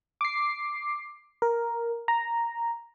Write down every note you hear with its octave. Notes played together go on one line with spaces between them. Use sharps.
D6 C7
A#4
A#5